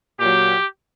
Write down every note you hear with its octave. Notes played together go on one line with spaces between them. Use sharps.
A#2 F#3 G4